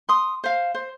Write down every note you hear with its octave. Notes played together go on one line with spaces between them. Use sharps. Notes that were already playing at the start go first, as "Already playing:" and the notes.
C6 D#6
C5 F5
C5